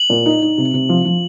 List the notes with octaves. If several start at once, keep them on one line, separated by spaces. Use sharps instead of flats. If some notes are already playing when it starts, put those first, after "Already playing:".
Already playing: F#7
A#2
D#4
D#4
C3
C3
F3
F3